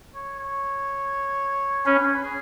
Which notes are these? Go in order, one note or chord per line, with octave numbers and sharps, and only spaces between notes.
C#5
C#5
C#4 B4
C#5
B4
G#4